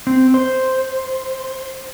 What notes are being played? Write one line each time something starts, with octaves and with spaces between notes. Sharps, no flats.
C4
C5